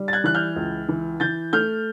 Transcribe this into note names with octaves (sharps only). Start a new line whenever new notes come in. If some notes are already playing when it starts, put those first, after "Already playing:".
Already playing: G3
A6
F#6 G#6
E3 F#6
F6 G6
C#2
E3
E3 G6 A6
A3 F6 G6